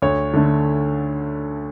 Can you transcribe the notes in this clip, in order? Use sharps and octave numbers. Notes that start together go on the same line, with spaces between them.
D2 C#5
D3 A3